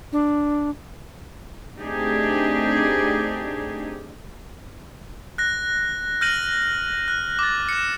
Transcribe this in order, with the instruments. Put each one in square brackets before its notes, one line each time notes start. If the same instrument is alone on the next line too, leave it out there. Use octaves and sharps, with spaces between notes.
[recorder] D4
[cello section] A3 C4 D4 D#4 G4 G#4
[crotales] F#6 A#6
F6 G6 A#6 D#7 F#7
F#6
D6 A6
C#7 E7